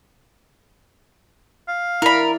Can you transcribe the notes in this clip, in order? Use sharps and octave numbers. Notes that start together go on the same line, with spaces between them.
F5
E4 A#4 D5 B5